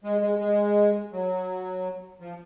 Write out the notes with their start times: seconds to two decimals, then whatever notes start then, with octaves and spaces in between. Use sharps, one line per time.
0.04 G#3
0.22 G#3
0.40 G#3
1.13 F#3
2.20 F3